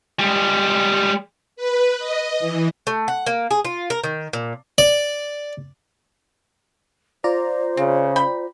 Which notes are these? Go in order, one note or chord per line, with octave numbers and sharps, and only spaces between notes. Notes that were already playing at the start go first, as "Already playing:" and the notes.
G3 G#3
B4
D#5
E3
A3
F#5
A#3
G#4
F4
A#4
D#3
A#2
D5
F4 C5 D5 A#5
C#3 C4
G5 B5